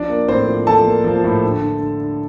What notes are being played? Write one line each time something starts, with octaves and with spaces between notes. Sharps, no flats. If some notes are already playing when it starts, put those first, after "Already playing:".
Already playing: F3 D4 D5
A#3
A2 C4 C5
F3
F3 A4 A5
A#3
F3
A2
D3
D3
D3
D3